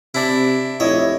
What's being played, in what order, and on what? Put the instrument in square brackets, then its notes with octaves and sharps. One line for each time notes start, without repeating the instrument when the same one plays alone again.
[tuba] C3 [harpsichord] D4 E4
[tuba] F1 [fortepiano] E4 D#5 [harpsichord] C#5